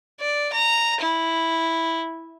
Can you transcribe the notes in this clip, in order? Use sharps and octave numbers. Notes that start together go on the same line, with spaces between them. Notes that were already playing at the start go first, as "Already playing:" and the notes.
D5
A#5
E4